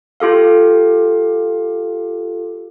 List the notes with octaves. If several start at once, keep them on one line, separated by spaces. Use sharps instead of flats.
F4 G4 A4 F5